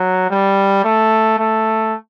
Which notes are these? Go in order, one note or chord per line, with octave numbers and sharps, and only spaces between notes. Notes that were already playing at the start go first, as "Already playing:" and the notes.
Already playing: F#3
G3
A3
A3